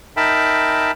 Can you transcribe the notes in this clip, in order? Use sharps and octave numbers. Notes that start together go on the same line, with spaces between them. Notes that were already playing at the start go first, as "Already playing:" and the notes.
D#4 A#4 E5 G5 A5 B5